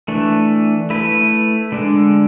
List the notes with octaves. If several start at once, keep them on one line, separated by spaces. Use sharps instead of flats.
E3 A3 D4
A3 E4 B4
D3 G#3 D4